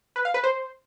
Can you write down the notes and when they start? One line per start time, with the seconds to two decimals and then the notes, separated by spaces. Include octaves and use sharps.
0.16 B4
0.25 F5
0.34 B4
0.44 C5